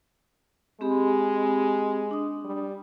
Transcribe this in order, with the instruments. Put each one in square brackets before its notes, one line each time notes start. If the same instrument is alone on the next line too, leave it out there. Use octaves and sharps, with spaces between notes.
[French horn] G#3 [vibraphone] C4 G4 B5
[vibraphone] D4 D#6
[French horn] G3